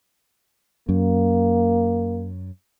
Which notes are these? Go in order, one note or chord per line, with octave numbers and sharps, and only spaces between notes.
F#2 A#3